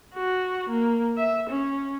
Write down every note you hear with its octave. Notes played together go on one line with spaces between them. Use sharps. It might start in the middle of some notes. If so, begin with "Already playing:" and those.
F#4
A#3
E5
C#4